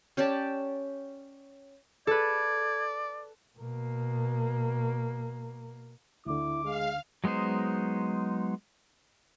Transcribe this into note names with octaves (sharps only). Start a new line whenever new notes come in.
C#4 G4 D5 A5
A4 B4 D5 G#6
B2 A#3
D2 D3 E4 D6
G#3 F5
F#3 G#3 B3 D#4 C5